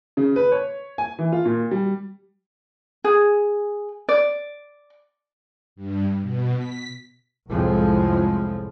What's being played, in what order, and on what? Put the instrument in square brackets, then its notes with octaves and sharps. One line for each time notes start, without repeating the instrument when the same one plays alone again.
[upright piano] C#3
B4
C#5
G#5
E3
F4
A#2
G3
[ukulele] G#4
D5
[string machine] G2
B2
B6
[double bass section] C2 F2 A2 F3 G#3